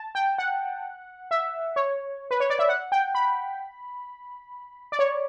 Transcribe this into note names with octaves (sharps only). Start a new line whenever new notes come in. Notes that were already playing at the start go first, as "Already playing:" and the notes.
Already playing: A5
G5
F#5
E5
C#5
B4
C#5
D5
E5
F#5
G5
B5
D5
C#5